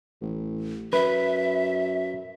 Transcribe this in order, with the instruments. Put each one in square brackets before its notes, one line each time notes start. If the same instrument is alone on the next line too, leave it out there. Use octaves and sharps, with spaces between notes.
[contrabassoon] A1
[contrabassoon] F#2 [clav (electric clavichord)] B4 [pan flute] E5